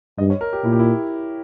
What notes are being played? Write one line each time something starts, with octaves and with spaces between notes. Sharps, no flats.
G2 D#5
C#5
A#4
G4
A#2 E4
G4
E4